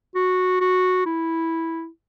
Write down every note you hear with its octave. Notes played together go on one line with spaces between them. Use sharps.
F#4
F#4
E4